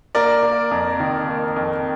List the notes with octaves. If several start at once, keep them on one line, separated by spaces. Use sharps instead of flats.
A#3 A#4 D5
A#3
F2
D#3
A#3
F2